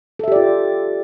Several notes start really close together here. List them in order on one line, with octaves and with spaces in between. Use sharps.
A4 E5 G4 D5 F4